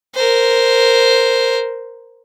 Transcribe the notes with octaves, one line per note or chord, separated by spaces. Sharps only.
A#4 C5